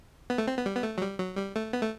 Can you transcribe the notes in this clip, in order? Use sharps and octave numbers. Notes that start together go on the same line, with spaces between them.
B3
A3
C4
B3
G3
B3
A3
F#3
G3
F#3
G3
A3
B3
A3